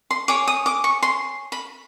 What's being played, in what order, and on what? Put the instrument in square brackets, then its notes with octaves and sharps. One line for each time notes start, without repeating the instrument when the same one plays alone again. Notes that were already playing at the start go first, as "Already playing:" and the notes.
[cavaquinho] C6
G#4 C#5 D6
D#6
D6
C#6
C6
B5